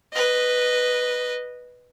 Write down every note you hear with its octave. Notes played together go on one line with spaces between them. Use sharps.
B4 D#5